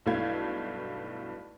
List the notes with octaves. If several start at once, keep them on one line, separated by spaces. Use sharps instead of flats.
B1 G2 A3 E4 F5 G#6